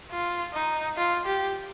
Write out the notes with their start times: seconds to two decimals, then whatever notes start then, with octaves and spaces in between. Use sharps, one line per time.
0.11 F4
0.54 D#4
0.97 F4
1.26 G4